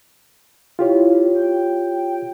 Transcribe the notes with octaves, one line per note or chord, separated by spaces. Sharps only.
E4 F4 G4 C#5
G5